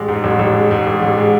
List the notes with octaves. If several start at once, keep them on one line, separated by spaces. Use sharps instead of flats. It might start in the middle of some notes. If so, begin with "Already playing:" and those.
Already playing: A1 G#3
G#2
A1
A1
G#3
G#2
A1
A1
G#3